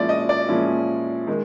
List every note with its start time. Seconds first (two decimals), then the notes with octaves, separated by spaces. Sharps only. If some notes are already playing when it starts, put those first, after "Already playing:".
Already playing: A#2 F3 G#3 C#4 E4 D5
0.09 D#5
0.29 D5
0.48 A#2 F3 G#3 C#4 E4
1.27 D#3 G#3